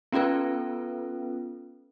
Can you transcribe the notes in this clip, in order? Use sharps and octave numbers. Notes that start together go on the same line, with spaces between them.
B3 C#4 F4 A4 B4